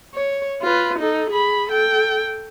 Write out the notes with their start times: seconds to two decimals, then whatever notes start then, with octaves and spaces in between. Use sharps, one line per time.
0.14 C#5
0.61 F4 B4
0.99 D#4 A4
1.30 G#4 B5
1.70 A4 G5